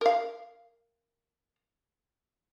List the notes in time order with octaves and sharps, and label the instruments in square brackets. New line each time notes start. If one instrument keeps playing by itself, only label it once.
[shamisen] A#4 F5